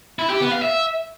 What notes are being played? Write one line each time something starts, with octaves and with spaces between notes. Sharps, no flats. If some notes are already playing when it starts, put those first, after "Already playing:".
E4
G4
B3
F5
E5